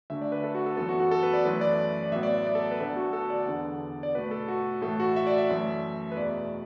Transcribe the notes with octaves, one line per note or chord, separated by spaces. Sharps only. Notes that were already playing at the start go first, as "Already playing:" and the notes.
D2 D3 A3 E5
D5
B4
A4
F#4
A4
F#2 E3 B3 A4
F#4
F#4
A4
B4
D5
F#2 E3 A3 B4
D5
D5
A2 F#3 B3 E5
D5
E5
D5
A4
B4
D2 D3 B3 A4
F#4
A4
D5
E2 D3 B3
D5
B2 A3 B4
A4
F#4
A2 E3 A3 A4
F#4
E5
D5
E5
F#2 E3 A3
B4
E2 B2 A3 D5